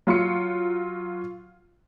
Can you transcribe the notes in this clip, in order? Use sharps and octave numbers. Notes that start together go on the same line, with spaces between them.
F#3 F4 C6 C#7